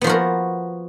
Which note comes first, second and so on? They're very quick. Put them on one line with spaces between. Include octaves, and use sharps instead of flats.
B3 F3 F#4 A#4